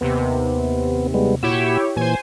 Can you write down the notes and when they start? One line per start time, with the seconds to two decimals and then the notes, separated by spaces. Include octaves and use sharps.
0.01 D#2 C3 B3
1.14 G3 G#3 B3
1.43 A#2 E4 F#4 G4 C#5 E6
1.96 A#2 E3 C5 G#5